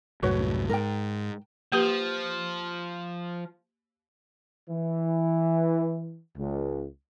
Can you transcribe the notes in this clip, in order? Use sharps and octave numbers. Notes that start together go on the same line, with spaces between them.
C2 F#2 A2 F#4 B4 C#5
G#2 A#4 G5
F3 A#3 G4 B4
E3
C#2